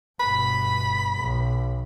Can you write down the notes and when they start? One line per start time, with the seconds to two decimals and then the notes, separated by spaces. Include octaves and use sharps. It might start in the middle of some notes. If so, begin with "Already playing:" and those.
0.20 G1 B2 B5
1.17 B1